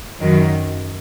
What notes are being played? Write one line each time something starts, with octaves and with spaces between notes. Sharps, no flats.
F#2 D#3 F#3